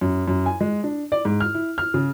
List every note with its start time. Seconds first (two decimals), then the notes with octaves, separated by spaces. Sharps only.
0.01 F#2
0.28 F#2
0.46 G#5
0.61 G#3
0.84 D4
1.12 D5
1.25 G#2
1.40 F6
1.54 E4
1.78 F6
1.94 C#3